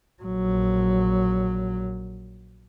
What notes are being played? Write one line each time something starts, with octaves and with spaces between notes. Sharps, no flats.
A#1 F#3